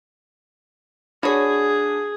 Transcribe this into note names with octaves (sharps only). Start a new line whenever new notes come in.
D4 F#4 G#4 C#5 B5